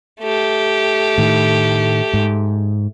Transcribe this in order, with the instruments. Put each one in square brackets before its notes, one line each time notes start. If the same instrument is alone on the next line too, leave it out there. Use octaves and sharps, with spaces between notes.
[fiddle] A3 G4
[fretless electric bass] A2 D#3
G#2